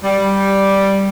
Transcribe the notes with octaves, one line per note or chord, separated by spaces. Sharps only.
G3